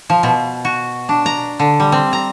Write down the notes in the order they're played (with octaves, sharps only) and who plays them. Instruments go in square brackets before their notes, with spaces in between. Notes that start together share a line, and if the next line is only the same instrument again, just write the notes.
[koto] F3
B2
F#4
D4
A#5
D3
G3
C4
A#5